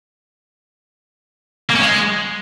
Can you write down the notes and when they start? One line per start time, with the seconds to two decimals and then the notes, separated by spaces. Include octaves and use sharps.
1.70 A#3
1.75 C#4
1.80 G#3